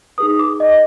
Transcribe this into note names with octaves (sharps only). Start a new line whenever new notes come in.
D#4 G#4 B4 D#6
D6
D#5